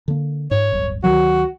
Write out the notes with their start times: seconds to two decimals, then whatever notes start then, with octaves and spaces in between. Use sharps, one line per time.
0.08 D3 A#3
0.51 G#2 C#5
0.72 D1 G1
1.04 D2 D#3 F#3 F#4